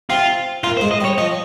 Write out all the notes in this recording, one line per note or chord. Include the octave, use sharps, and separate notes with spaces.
C3 C4 F4
A#2 A#3 F4
C5
G#2 G#3
D#5
G3
C#5
F3 D#5